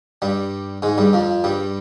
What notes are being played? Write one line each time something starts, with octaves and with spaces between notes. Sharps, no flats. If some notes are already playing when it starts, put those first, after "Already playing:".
G2 G3
G#2 G#3
G2 G3
F2 F3
G2 G3